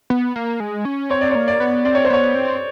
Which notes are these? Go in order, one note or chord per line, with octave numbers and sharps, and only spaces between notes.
B3
A#3
G#3
C#4
C4 C#5
D5
A#3 C#5
D5
B3
C4 D5
C#5
C5
B3 C#5
C4